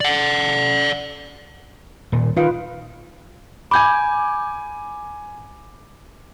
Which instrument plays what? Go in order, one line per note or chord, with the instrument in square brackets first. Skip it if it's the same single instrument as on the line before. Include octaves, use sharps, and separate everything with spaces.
[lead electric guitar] D5 F#5
[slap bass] D#1 A#2
[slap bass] D#3 [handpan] F4 B4 F5
[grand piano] G#5 D6 [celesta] B5 G6 G#6